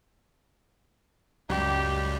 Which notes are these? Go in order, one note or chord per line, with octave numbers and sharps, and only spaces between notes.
C#2 F#2 G3 G4